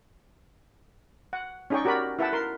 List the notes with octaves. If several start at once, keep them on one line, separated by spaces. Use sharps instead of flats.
F#5
C#4 D#4 G#4 D5 G5 C#6
F#4 G4 A#4 D5 B5
E4 B4 E5 F#5 G5 A5
A#4 C6